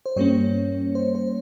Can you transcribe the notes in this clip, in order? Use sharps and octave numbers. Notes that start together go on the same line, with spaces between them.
C5
G2 G3 A#3 C#4 C#5
C5
C5